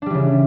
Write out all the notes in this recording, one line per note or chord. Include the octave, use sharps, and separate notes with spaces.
C#3 E3 G3 D4